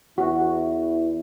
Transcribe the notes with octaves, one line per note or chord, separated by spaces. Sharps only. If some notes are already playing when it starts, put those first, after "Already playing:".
E2 E4 F#4